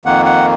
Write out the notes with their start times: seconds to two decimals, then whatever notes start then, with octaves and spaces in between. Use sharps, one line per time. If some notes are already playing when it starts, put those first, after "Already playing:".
0.05 F2 D#3 A#3 F#5
0.25 F#5